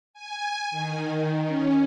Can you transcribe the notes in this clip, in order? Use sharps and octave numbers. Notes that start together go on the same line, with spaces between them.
G#5
D#3
C#4